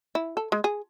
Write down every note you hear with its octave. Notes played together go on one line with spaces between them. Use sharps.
E4
A4
G#3
G#4